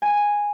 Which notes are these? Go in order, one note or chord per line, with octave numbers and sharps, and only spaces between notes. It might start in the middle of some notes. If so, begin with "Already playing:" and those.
G#5